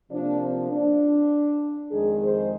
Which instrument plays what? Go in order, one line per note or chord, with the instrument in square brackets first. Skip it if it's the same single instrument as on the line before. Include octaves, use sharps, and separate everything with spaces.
[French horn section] C3 F3 A#3 D4
C4
D4
F2 D#3 G#3 G#4
C5